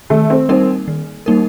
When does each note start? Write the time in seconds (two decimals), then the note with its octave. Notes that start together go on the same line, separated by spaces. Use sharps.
0.10 D#3 A3
0.30 C4
0.49 G3 A#3 C4 D#4 A#4
0.88 D#3
1.26 G3 A#3 D#4 A#4